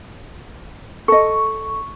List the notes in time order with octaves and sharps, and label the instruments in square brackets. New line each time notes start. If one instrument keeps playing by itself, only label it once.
[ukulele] A4 D#5 [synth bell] C#6